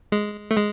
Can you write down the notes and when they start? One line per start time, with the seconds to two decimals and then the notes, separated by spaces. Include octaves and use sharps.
0.12 G#3
0.51 A3
0.56 G#3